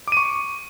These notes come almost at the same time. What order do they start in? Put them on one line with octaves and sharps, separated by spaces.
D6 D#7 C#6